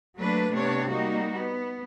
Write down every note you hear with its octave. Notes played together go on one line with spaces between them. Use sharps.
F#3 A3 A#3 D4 B4
C3 B3 D4 C#5
G3 A#3 D#4 F#4
B3